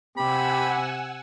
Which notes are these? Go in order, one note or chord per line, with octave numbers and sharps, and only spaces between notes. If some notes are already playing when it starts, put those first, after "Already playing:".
C3 G4 F#5 G#5 B5 E6